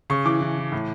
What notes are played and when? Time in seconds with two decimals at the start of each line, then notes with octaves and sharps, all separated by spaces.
0.10 C#3 C#6
0.25 E3 D6
0.41 E3
0.58 E3
0.72 A2